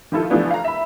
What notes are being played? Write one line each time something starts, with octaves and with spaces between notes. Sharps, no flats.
D#3 F3 E4 F4 A4
E3 F3 A3 B3 D4
F5 A#5
E5 B5